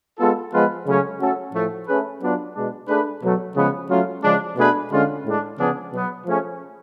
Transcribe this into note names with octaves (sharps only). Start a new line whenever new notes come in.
G#3 B3 F4 A4
F3 G#3 B3 F4 B4
C#3 F#3 A3 C#4
A3 C#4 F#4 A4
A2 F3 A3
A3 C#4 G#4 B4
F#3 B3 D4 F4
B2 G#3 D4
A3 D4 G#4 B4
B2 F#3 A3
C#3 F3 G#3 B3
F#3 A3 C#4 F4
C#3 F3 G#3 D4
B2 A3 D4 G#4 B4
D3 G#3 C#4 F4
A2 G#3 D4
C#3 F3 B3 D4 G#4
B2 F#3 B3
F3 A3 C#4 G#4